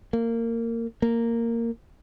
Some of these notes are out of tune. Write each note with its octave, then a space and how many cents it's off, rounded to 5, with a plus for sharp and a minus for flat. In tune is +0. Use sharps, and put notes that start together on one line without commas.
A#3 -20
A#3 -10